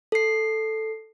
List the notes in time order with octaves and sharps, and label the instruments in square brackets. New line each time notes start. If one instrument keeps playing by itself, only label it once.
[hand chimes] A4 C7